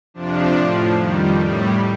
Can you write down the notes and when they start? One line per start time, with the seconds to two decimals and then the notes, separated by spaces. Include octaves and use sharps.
0.14 F2 C3 F3 D4
0.56 A2 F3
0.97 F2 D#3 G3
1.39 A2 G3